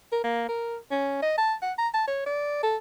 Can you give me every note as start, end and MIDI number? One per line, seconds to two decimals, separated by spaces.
0.12 0.21 70
0.24 0.47 58
0.48 0.77 70
0.91 1.18 61
1.22 1.35 75
1.38 1.54 81
1.62 1.72 78
1.78 1.88 82
1.94 2.05 81
2.08 2.26 73
2.26 2.61 74
2.63 2.76 69